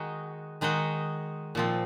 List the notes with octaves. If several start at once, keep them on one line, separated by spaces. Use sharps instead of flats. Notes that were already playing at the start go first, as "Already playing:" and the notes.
Already playing: D#3 G#3 D#4 F#4
D#3 G#3 D#4 F#4
A#2 F3 C4